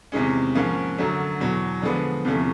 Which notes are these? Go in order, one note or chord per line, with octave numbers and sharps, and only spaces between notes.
E2 C3 D#3 G#3 C#4
G#2 F3 A#3 C#4
F#2 D3 F#3 A3
E2 B2 F#3
D3 F3 G#3 B3 D4
E2 C3 F3 A3 C#4